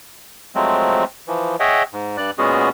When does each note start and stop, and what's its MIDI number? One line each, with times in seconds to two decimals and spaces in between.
0.55 1.04 53
0.55 1.04 54
0.55 1.04 56
0.55 1.04 57
0.55 1.04 60
1.28 1.56 52
1.28 1.56 53
1.60 1.83 68
1.60 1.83 73
1.60 1.83 75
1.60 1.83 76
1.60 1.83 78
1.60 1.83 79
1.93 2.17 44
2.17 2.31 43
2.17 2.31 74
2.17 2.31 90
2.38 2.69 46
2.38 2.69 56
2.38 2.69 59
2.38 2.69 61
2.38 2.69 66
2.38 2.69 68